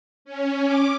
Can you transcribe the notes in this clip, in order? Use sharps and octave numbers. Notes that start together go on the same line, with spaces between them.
C#4
D6